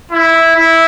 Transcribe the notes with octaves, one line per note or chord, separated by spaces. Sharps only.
E4
E4